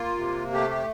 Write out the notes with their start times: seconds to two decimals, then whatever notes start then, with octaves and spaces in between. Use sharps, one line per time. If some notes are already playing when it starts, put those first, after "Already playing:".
Already playing: A#3 F4
0.18 C3
0.52 A3 G4
0.70 G4